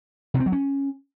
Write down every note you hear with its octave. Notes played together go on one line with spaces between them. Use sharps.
C3
C4
F#3
C#4